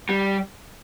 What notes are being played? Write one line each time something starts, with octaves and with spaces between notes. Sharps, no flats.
G3